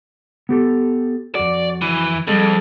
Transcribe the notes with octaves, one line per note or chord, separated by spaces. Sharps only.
B3 G4 A4
F2 F#4 D5
E3
F2 G3 G#3 A4